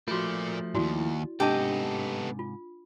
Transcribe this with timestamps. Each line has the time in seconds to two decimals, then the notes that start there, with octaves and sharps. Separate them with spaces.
0.08 F3 A3 A#3 F4 F#4 D5
0.74 D#2 G#2 E4 F#4 D5
1.40 G#2 C3 B3 D4 G4 A4 D#5 A5
2.39 F4